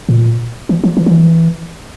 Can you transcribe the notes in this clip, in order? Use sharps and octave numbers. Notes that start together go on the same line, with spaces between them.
A2
A#2
E3
F3
E3
F3
E3